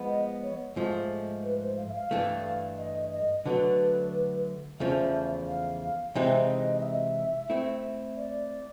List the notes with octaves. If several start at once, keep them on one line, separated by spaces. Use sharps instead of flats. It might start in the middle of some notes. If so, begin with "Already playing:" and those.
Already playing: F3 G#3 B3
D#5
C#5
G#2 F3 A3
B4
C5
F5
E5
F5
G2 E3 A3
D#5
D#5
D3 F#3 A3 B4
E2 C#3 F3 A3 E5
F5
C3 E3 G#3 C4 D#4 E5
D#5
D#5
E5
A3 C4 E4
D5